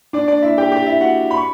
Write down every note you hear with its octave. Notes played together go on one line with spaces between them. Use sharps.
D4 D5
D4 D5
E4 E5
G4 G5
G4 G5
E4 E5
F#4 F#5
B5
C#6